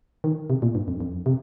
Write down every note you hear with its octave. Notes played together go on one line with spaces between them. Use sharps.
D#3
C3
A#2
G2
F2
F2
C3